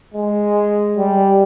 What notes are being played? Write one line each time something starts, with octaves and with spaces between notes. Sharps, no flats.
G#3
G3